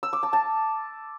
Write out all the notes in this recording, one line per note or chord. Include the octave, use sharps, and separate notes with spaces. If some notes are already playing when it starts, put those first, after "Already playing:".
E6
D6
A5
A5